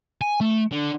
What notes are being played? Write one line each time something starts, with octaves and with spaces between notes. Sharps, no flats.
G#5
A3
D3